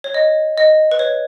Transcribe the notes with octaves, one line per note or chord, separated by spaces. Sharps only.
C#5
D#5
D#5
B4
C#5